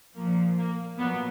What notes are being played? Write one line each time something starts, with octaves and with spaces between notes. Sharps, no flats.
A#2 F3 A#3
A#3
A#2 F#3 B3